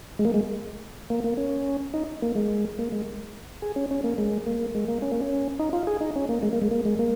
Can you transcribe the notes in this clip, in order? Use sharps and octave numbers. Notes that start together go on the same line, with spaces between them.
G#3
A#3
G#3
A#3
A#3
C#4
D#4
A#3
G#3
A#3
G#3
G#4
C#4
C#4
A#3
G#3
A#3
G#3
A#3
C#4
A#3
C#4
D#4
F4
G#4
D#4
C#4
A#3
G#3
A#3
G#3
A#3
G#3
A#3